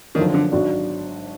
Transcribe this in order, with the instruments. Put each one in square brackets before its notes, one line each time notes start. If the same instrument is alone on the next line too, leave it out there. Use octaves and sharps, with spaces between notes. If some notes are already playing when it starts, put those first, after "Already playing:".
[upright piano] F#2 D3 F3 [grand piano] D#3
[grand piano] D3
[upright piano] G#1 G#2 F#3 D4 F#4